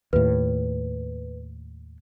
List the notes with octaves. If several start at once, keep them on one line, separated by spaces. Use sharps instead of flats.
D#2 A2 B4